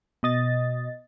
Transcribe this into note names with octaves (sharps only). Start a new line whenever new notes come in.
B2 D#5 A6